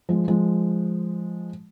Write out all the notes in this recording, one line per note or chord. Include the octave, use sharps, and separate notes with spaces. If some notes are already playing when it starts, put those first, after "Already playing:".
F3 G#3
F3 G#3